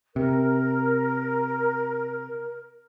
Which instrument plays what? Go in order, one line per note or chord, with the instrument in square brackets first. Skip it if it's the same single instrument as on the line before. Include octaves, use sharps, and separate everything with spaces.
[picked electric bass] C3 [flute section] A#4